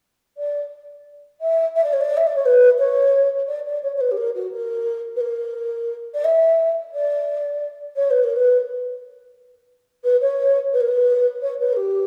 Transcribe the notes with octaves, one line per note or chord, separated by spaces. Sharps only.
D5
E5
E5
D5
C#5
D5
E5
D5
C#5
B4
C#5
D5
D5
C#5
C#5
B4
G4
A#4
F#4
A#4
B4
A#4
D5
E5
D5
C#5
B4
A#4
B4
B4
C#5
B4
A#4
B4
C#5
B4
A#4
G4